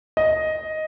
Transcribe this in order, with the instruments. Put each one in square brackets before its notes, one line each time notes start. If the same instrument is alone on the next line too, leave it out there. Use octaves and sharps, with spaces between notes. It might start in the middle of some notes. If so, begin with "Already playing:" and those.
[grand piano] D#5